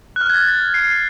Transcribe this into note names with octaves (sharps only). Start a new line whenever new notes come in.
F#6
F6
G#6
A6
A6
C7